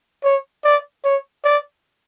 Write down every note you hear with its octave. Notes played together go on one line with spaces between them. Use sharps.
C#5
D5
C#5
D5